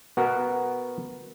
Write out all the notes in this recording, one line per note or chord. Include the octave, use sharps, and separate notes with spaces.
B3 F#4 A#4